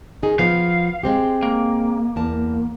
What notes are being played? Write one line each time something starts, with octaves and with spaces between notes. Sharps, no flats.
D#3 D#4 G#4
F3 B3 F5
G#3 C4 G4
A#3
E2 A#4 A5